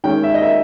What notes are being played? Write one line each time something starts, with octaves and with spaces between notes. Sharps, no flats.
D#3 G#3 C#4 G5
E5
D#5
E5